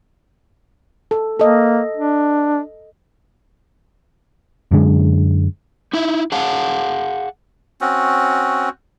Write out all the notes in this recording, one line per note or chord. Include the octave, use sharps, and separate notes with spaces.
A4
A#3 A4 D#5
D4
F#2 D3 G#3
D#4 E4 E5
G#4 F5 F#5 A5
C4 C#4 F#4